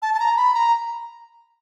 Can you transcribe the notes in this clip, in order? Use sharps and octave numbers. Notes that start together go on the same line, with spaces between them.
A5
A5
A#5
B5
A#5